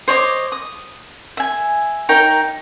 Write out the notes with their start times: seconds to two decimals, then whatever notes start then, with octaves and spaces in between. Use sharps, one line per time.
0.08 C5 C#5 D#5 D6
0.52 D#6
1.37 E5 G#5
2.09 D#4 A#4 C#5 G5